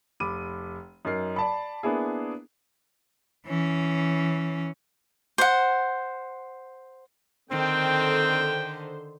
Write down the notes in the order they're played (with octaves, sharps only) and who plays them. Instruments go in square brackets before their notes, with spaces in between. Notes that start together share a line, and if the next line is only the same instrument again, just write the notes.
[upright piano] F1 B5 D6 D#7
F#2 D#4 A#4 C7
D5 A5 B5
A#3 B3 D4 E4 G#4
[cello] E3 C#4
[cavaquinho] C5 F#5
[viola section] D3 A4 C5 [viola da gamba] D#3 [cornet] C4 [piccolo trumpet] G5